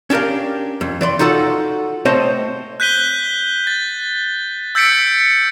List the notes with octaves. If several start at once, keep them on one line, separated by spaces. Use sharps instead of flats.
C#4 D4 G4 A#4 F5
F2
E3 D5 C6
D#4 F4 F#4 A4 F#5
A3 C4 C5 C#5 D#5 A5
F#6 G6 B6 D#7 G7
A6
E6 G6 A6 B6 C#7 D7